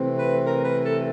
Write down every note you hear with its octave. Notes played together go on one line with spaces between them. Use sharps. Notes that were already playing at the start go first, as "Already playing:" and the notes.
Already playing: C3 E3 A3 C4
B4
A#4
B4
A4